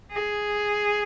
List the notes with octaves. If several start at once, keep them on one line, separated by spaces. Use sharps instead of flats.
G#4